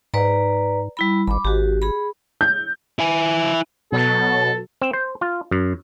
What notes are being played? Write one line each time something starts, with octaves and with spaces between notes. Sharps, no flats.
G#2 B4 D5 A#5
G3 E4 B5
G#1 B5 D6
G#1 F#4 G4
G#4 B5
G6
E4 G#5
B2 F#3 A4
C4
C5
F4
F#2